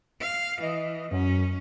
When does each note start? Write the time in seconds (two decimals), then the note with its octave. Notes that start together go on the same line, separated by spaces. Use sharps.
0.22 F5
0.62 E3 D#5
1.11 F#2 C#4